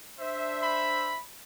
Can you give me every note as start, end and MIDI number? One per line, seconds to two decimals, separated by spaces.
0.20 1.18 62
0.20 1.18 72
0.20 1.18 76
0.62 1.21 83